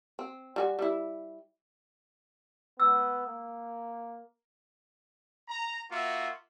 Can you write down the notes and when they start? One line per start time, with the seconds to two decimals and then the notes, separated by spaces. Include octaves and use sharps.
0.19 C4
0.56 G3 F#4 G#5
0.79 G3 E4
2.80 B3 E6
3.27 A#3
5.48 A#5
5.90 A#3 F4 F#4 E5